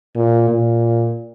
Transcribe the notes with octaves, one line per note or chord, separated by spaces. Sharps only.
A#2
A#2